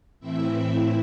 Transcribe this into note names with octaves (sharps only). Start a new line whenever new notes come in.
A2 E3 C4 E4 E5